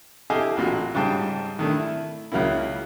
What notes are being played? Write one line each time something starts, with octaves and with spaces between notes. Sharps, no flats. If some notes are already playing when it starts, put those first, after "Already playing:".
E4 G4 A4 D#5 F5 G#5
A1 A#2 F#4
G#2 C#3 G3 G5 A5
D#3 A3 D4
E4
C#2 C#3 F#3 A#3 E4